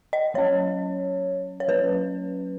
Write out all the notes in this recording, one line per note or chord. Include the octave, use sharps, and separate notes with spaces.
D#5
F#3 C#4 C#5
C#5
F#3 C#4 B4